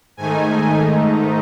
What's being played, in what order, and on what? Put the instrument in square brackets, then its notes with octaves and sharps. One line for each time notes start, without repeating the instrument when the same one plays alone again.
[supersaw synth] G#2 D#3 A3 D#4 G#5